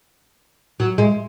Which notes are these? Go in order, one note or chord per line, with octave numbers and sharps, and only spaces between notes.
F#3
G#3